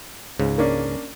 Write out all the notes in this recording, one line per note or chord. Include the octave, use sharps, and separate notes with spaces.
C#2 G#2 C#3
A#3 C#4 D4